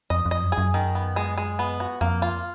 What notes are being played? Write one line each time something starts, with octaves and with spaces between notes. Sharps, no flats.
F2 D#5
F2
D#5
F#2
G#4
F#2
D#3
B3
G#3
G#3
B3
F#4
F2 A#3
F4